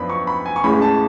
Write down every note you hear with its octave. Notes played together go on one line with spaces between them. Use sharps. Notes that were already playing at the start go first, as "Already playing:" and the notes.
Already playing: F#2 F3 B3 D4 B5
C#6
B5
G#5
C#6
A1 A2 G#3 C#4 B5
A5